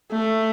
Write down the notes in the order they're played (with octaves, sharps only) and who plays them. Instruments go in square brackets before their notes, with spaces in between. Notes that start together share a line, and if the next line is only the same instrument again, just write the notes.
[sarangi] A3